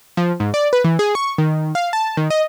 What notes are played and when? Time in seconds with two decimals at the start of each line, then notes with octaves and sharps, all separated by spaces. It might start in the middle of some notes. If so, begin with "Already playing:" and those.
0.17 F3
0.40 G#2
0.54 D5
0.73 B4
0.84 E3
0.99 G#4
1.15 C#6
1.38 D#3
1.75 F5
1.93 A5
2.17 D#3
2.30 D#5